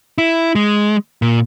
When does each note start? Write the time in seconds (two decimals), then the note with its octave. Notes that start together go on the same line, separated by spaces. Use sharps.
0.18 E4
0.55 G#3
1.22 A#2